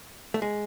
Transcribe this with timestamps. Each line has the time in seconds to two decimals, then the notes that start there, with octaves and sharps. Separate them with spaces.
0.34 A3
0.42 G#3